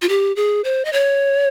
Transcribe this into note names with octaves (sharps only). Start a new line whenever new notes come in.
F4
G4
G#4
C5
D#5
C#5